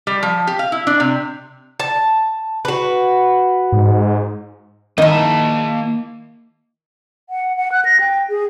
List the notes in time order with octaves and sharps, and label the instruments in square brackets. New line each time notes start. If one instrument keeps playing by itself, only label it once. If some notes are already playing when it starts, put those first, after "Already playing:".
[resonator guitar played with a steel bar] G3
F3
G4
F5
E4
D4
C3
[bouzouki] A5
F#4 B4
[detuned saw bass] G#2
[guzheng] D#3 E4 [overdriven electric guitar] A#3 A5 [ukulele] D#5
[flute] F#5
F#5
F#6
A#6
G5
G#4